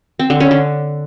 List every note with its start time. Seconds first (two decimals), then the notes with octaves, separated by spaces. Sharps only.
0.19 C4
0.30 D3
0.40 C#4
0.51 D3